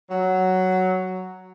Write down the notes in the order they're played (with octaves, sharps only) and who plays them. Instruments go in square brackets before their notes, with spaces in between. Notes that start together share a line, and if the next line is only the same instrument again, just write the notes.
[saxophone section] F#3